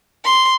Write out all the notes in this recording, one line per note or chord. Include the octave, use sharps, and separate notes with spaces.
C6